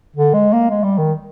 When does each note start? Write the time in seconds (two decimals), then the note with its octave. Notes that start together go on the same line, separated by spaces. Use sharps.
0.17 D3
0.34 G#3
0.53 A#3
0.70 G#3
0.84 G3
0.98 D#3